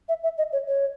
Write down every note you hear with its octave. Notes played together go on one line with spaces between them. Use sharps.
E5
E5
D#5
C#5
C#5